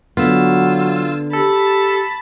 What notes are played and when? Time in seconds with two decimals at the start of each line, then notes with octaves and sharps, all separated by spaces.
0.17 D3 F#3 B3 F4 E6
1.33 G4 A4 A5 B5